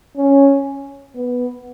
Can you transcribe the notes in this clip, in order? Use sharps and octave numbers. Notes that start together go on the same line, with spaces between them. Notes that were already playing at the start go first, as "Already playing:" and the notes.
C#4
B3